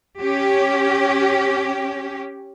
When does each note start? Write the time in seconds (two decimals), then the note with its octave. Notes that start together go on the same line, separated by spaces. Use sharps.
0.20 C#4 G4